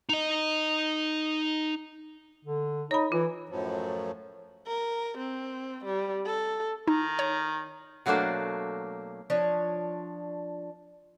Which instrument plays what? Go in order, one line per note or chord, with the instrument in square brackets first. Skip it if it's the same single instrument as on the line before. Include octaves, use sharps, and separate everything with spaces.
[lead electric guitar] D#4 D#5
[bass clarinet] D3
[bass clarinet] D#4 [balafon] C#5 B5
[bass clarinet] E3 [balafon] F4
[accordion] F#2 A2 F3 F#3
[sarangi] A#4
C4
G3
A4
[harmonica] D#3 A#5 [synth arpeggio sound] D#4
[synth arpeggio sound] C#5
[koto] B2 F#3 A3 A#3 D4 C5
[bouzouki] F3 D4 C#5